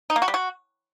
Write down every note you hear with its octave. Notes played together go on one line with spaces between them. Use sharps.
D#4
A#3
F#4
G3
F#4